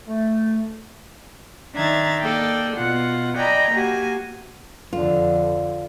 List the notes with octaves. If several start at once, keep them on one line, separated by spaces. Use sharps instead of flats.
A3
D#3 D4 E5 A#5 G#6 A6
A#3 A4 D5 D#5 G5
B2 F4 F#5
D5 D#5 G5 G#5 A#5 B5
A#3 F#4 G4 G#5
F2 D3 F4